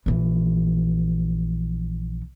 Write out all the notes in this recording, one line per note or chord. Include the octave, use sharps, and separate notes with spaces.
A#1 E3